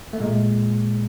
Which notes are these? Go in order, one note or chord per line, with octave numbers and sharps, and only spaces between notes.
A3
A#2 G#3